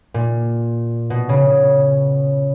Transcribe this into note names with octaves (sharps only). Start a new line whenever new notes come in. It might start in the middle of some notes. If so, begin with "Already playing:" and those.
A#2
B2
C#3